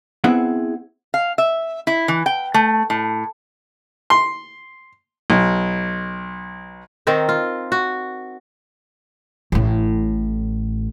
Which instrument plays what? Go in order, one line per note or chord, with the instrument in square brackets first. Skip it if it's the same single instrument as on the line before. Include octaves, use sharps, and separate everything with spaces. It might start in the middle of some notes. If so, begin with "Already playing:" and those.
[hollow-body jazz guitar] B3 C4 E4 G#4 F#5
[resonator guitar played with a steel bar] F5
E5
E4
E3
G5
A3
A2
[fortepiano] C6
B1
[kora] D#3 C4 D#4
F4
F#4
[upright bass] A1 A2